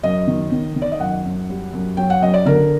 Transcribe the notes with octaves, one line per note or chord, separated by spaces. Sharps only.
F#2 D#5
D#3
D#3
D#3
D5
D#5
F#2 F#5
F#2
G3
F#2
F#3 G5
F#5
F#2 D#5
D5
D3 A#4